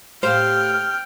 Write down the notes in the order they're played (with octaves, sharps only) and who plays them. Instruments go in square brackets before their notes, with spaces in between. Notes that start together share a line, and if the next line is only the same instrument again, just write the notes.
[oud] A2 G4 F5 [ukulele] C5 [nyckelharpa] G5 [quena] F6